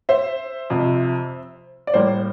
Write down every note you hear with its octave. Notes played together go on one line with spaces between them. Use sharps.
C5 E5
F2 C3 F3
D5
A2 G3 A#3 C5